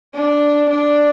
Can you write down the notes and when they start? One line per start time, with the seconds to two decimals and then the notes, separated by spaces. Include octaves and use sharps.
0.15 D4
0.70 D4